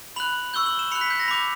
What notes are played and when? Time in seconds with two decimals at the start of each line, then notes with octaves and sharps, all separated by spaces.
0.16 B5 F#6 F#7
0.54 C#6 E6 G6 G7
0.66 F#7
0.79 E7
0.91 B5 C#7
0.95 F#6
1.01 B6
1.10 G6
1.19 A#6
1.28 B5 D6 G6